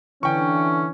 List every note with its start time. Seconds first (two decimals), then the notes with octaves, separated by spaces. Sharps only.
0.23 D3 E3 C#4 G5 C#6